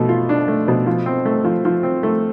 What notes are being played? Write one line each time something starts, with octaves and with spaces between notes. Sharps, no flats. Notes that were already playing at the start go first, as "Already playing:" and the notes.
Already playing: B2 A3
F4
D4
A3
B2
F3
C4
A3
F3
F3
C4
A3